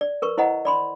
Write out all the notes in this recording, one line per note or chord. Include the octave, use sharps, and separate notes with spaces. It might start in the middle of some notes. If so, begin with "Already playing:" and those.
D5
A#4 B4 C#6
E4 C5 D#5 F#5 A#5
D5 B5 C6